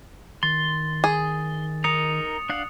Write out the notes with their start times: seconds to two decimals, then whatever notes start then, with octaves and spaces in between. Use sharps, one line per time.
0.43 D#3 C6 A6
1.04 G#4
1.84 D#4 A#4 D#6 C#7 F7
2.49 D4 F5 F#5